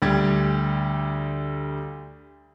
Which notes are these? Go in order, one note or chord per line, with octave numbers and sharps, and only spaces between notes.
D2 G3 G4 G#6